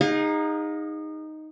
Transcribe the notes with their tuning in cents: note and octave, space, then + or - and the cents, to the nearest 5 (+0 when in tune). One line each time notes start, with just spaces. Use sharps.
D#4 +0 G#4 -30 F5 +35